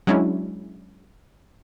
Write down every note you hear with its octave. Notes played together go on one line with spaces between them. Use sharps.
F#3 G#3 C#4 D4 E4